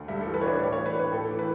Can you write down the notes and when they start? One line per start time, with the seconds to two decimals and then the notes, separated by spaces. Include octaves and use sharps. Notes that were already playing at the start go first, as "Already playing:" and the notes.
Already playing: D2
0.08 G2 E5
0.21 A4
0.26 E3
0.34 B4
0.41 D4 C#5
0.48 B4
0.60 A2 D5
0.73 C#5
0.77 E3
0.86 B4
0.94 D4
0.99 B4
1.12 A2 A4
1.30 E3
1.39 B4